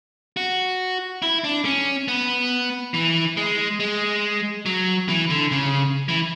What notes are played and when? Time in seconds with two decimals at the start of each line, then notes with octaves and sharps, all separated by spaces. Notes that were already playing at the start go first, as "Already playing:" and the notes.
0.37 F#4
1.22 E4
1.44 D4
1.65 C#4
2.08 B3
2.94 E3
3.37 G#3
3.80 G#3
4.66 F#3
5.09 E3
5.30 D3
5.52 C#3
6.09 E3